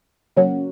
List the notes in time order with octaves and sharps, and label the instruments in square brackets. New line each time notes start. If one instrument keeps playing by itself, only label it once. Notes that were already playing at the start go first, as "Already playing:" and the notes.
[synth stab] C#3 F#3 A#3 C#4 F#4